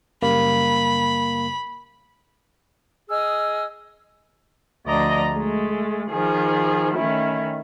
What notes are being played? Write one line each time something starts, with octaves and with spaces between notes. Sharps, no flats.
F#2 C#3 G3 A#3 B5
G#4 D#5 E6 F6
D2 F3 D5 D#5 A#5 A#6
G#3 A3
D#3 F3 G#4
D#3 A3 C#4 E4